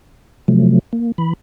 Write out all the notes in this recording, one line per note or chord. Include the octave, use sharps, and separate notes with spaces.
C3 F3 F#3 A3
A#3
E3 B5